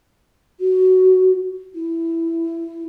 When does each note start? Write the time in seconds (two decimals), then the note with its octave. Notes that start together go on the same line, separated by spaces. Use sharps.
0.59 F#4
1.74 E4